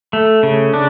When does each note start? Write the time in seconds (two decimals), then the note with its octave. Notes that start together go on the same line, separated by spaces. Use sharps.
0.13 A3
0.43 C#3
0.74 D4